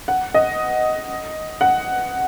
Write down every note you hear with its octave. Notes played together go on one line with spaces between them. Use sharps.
F#5
D#5
F#5